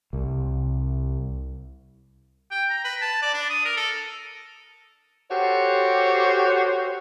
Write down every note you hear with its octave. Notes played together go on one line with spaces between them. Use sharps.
C2
G5
A#5
B4
A5
D5
D4
D#6
A#4
A4
F#4 G4 A4 C5 C#5